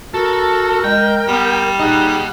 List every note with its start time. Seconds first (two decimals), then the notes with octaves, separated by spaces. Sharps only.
0.14 F#4 A4 A#4
0.84 G#3 G5
1.28 G3 B3
1.80 D#4 G#4 D#5 F#5